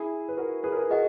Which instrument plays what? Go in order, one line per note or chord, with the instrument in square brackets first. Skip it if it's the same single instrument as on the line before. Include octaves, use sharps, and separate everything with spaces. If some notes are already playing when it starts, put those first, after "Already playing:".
Already playing: [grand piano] E4 G#4
B4
F#4 A#4
G#4 B4
A#4
G#4 B4
[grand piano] F#4 A#4 [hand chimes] G#4 D#5 F#5